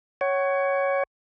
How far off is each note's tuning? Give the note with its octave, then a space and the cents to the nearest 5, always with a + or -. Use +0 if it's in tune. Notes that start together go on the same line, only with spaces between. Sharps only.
C#5 +0 F#5 +30